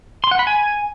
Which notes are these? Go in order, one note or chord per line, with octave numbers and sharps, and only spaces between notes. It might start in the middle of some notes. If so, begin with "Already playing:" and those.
C6
F#5
B5
G#5